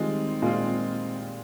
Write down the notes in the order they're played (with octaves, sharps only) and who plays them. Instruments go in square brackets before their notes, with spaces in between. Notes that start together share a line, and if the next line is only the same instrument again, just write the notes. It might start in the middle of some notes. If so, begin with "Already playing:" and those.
Already playing: [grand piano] D#3 G3 [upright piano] G#3 C4 F4
[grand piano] A#2 [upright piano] G#3 C4 F4